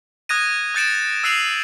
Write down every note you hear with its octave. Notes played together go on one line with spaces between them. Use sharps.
D#6 F#6 G#6 A#6 D#7
D#6 G6 A6 C#7 D7 E7
E6 F#6 C7 D#7 F7 F#7